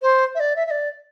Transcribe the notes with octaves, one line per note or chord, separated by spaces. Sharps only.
C5
E5
D5
E5
E5
D5